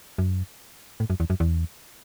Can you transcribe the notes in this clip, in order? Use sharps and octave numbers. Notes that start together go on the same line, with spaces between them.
F#2
A2
F#2
E2
F#2
E2